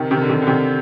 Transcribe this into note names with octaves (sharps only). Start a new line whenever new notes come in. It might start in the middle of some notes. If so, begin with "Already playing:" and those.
Already playing: C3 D#3
C3 D#3
D3
C3 D#3
D3
C3 D#3